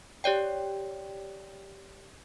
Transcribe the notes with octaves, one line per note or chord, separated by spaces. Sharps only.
G4 C#5 D5 G5